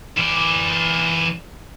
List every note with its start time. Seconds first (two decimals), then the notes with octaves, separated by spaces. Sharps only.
0.17 E3 D5